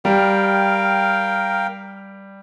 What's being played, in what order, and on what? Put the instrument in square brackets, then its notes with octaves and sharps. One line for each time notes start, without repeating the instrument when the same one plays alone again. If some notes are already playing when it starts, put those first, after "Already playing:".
[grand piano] G3 [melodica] A#4 F5 G5